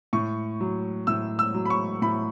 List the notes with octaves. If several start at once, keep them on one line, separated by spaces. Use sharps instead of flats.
A2 C#6
F#3
A2 E6
E6
F#3
B5
C#6
A2 B5